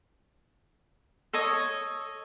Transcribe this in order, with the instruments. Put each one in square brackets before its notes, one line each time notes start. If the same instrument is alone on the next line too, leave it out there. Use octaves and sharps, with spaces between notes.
[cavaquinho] A4 C#5 D#5